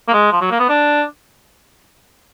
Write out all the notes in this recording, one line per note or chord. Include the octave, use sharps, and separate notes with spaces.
A#3
G#3
F3
F#3
A#3
B3
D4